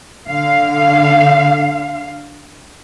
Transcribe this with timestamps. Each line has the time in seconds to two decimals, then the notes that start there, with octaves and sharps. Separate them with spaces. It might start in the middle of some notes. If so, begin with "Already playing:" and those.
0.29 D3 F5